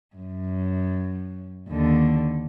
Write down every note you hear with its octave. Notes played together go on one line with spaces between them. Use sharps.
F#2
D#2 D3